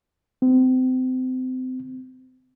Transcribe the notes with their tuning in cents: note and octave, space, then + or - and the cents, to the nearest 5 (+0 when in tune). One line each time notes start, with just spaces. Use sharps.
C4 -30